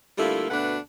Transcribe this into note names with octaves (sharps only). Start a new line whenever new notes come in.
D3 G3 A3 A#3 E4 F4
D2 B2 A3 D4 B4 F#5